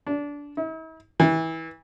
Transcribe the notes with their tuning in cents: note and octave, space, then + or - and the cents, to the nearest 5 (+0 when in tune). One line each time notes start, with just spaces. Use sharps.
D4 -20
E4 -45
E3 -25